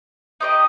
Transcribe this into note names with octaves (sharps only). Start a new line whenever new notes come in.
D#4 G4 C5 D#5